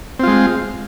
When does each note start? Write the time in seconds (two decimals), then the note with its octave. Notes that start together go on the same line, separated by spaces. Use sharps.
0.19 C4
0.23 F4
0.27 G#3